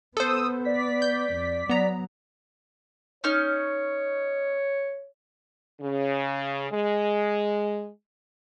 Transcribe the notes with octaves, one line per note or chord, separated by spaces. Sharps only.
B3 A4 C5 D#6 E6
D5 B6
G6
F2
F#3 B3 A#5
C#4 D#4 C#5 F6
C#3
G#3